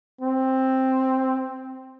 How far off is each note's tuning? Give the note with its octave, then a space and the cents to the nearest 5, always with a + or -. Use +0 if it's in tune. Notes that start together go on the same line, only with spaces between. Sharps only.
C4 +5